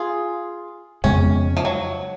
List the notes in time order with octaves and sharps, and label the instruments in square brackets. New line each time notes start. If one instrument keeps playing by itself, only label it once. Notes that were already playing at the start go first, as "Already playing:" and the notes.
Already playing: [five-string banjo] F4 G#4
[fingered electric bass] F2 C#3 G#3 B3 [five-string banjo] C#4
[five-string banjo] F3
F#3